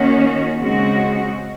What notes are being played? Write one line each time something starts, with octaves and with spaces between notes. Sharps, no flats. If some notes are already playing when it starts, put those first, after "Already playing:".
Already playing: D#3 A#3 C#4 F#4
C#3 G#3 C4 F#4